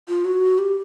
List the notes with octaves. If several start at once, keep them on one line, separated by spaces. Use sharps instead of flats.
F4
F#4
G4